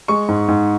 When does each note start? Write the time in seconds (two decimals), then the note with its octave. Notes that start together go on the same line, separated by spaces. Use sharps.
0.08 G#3 C#6
0.28 G#2
0.48 G#2